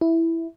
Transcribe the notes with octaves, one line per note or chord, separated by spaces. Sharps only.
E4